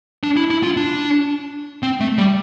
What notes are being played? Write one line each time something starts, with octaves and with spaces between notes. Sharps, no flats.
D4
E4
E4
F4
D4
C4
A3
G3